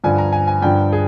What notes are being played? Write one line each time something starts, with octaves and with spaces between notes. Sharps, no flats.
G2 D3 F3 G#5
A#5
G#5
G#5
G2 D3 F3 G5
G#4